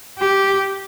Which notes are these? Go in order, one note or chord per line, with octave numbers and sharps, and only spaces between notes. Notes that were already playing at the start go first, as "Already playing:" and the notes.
G4